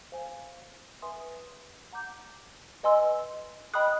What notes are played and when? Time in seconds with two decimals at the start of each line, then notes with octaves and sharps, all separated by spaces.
0.12 C5 F5 G#5
1.02 B4 E5 G#5 C6 D#6
1.92 F#5 A#5 D6 G6
2.83 B4 D#5 G#5 C6 E6
3.74 D#5 G5 B5 D#6 F#6